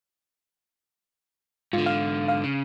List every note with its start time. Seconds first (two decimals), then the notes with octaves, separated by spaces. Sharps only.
1.73 G#2 D3 F4
1.86 F5
2.28 F5
2.44 C#3